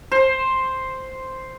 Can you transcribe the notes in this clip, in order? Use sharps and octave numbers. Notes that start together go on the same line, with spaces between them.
C5